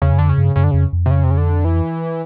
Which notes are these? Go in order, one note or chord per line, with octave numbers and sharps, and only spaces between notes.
E2 C#3
F#2
F2 D3
C#3
G2
F#2 C#3
D3
F2 C#3
F2
C3
C#3
C3
C#3
D3
E3